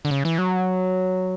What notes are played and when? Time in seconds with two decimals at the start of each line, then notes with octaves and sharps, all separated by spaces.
0.05 D3
0.11 C#3
0.25 E3
0.38 F#3